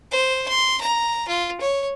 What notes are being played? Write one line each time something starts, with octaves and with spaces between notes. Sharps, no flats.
C5
C6
A#5
F4
C#5